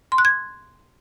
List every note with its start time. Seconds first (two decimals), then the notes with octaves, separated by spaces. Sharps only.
0.12 C6
0.18 F#6
0.25 G#6